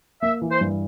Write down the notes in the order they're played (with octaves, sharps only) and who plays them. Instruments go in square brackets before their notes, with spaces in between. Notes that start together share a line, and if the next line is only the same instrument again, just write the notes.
[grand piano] A#3 [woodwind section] E5
[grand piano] E3
[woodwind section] C5
[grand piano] G2